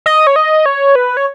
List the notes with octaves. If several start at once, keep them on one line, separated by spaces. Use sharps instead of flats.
D#5
C#5
D#5
C#5
B4
C#5